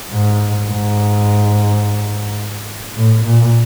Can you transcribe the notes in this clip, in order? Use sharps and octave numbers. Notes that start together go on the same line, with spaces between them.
G#2
G#2
A2
A#2